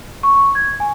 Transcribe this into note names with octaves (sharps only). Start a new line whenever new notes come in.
C#6
G#6
G#5